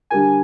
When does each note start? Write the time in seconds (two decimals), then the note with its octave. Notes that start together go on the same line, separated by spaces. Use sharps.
0.10 D3 G3 D4 G4 A#4 G#5